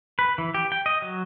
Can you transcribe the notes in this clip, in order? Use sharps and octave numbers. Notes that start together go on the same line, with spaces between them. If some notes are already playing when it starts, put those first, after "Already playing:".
B4
E3
G4
G5
D#5
F#3